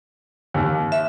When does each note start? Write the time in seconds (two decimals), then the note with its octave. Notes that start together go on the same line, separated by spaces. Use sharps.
0.54 D#2
0.92 E5